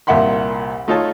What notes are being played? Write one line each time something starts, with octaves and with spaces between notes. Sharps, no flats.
C2 A#2 E5 F#5 B5 C6
A3 D#4 F4 A4 C#5 A5